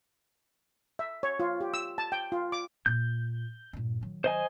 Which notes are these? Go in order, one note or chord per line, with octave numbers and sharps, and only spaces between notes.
E5
C#5
F4
G4
E6
A5
G5
F4
D6
A#2 G6
G2 A#2
D#3 F#3
C5 D#5 G#5